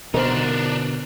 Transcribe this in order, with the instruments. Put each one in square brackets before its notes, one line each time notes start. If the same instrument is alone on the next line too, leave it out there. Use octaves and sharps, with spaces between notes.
[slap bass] B2 D3 [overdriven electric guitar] D4 D#4 [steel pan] A#4 C5